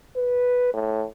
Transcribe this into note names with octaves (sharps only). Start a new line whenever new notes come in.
B4
A2